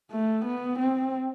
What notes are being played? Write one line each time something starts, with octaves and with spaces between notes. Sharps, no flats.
A3
B3
C4